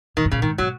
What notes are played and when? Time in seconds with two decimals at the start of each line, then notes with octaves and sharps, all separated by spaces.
0.17 A#2 D#3
0.25 G#2
0.31 A#2 C#3
0.42 G#2 D#3
0.58 B2 F#3